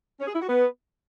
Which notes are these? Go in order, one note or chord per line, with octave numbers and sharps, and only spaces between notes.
C#4
G#4
E4
F#4
B3